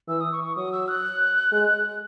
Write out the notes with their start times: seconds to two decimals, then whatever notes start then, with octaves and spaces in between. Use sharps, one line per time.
0.08 E3 E6
0.21 D#6
0.32 C#6
0.44 C#6
0.56 F#3 D#6
0.72 E6
0.88 F#6
1.52 G#3